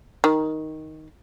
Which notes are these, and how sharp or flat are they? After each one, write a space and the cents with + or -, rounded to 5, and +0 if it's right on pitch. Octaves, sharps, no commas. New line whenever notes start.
D#3 +5